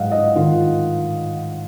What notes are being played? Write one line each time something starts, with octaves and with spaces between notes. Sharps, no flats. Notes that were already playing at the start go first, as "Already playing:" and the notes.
Already playing: G#2 F#3 D#5 F5 F#5
D#5
D#3 F4